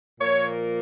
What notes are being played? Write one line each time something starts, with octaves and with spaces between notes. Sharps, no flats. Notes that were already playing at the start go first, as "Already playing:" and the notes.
A#2 F3 A#3 C#5